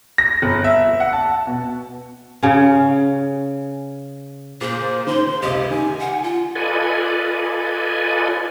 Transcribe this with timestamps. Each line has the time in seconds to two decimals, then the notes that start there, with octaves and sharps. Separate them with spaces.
0.18 A#6
0.42 G1
0.64 E5
1.00 F#5
1.13 A5
1.47 B2
2.43 C#3 C#4
4.61 A#2 G#4 C5
5.07 D#3 C6
5.42 C#2 C3 G4 D#5
5.70 D#3 G#5
6.00 F#5
6.23 F4
6.56 F4 A4 B4 D5 D#5 G#5